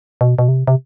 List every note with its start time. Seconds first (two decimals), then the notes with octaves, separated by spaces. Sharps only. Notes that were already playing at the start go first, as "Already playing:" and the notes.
0.21 B2
0.39 B2
0.48 C3
0.67 C3